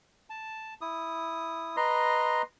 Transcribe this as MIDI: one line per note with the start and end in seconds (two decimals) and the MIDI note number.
0.30 0.74 81
0.81 1.76 64
0.81 1.76 87
1.77 2.42 71
1.77 2.42 75
1.77 2.42 82
1.77 2.42 84